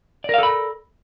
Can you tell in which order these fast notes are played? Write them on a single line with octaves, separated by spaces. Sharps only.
D5 A#4 F5 A4 B5